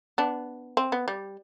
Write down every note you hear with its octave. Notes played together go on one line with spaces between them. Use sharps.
B3 D4
C4
B3
G3